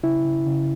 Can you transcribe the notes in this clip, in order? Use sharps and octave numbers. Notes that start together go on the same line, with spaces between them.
C#3 E4
C#3
C#3